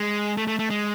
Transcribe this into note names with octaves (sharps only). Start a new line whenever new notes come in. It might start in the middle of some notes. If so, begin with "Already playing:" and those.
Already playing: G#3
A3
A3
A3
G#3